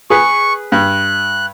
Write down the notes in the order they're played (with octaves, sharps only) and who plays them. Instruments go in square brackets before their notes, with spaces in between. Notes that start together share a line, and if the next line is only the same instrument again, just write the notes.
[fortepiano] G#4 B4 [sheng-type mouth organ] C#6
[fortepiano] G2 [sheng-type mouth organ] F#6